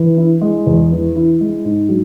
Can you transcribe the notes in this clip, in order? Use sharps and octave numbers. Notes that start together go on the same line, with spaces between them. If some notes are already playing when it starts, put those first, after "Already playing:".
Already playing: E3
E4
G#3
E2
E3
E4
G#3
G#2
F#3